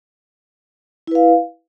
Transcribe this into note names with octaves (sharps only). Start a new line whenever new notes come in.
E4 B4 F5